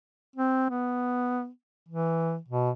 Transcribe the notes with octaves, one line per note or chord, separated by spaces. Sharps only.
C4
B3
E3
B2